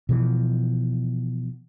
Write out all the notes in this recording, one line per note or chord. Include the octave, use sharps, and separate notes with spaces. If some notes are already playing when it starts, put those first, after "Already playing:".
B2 E3 F3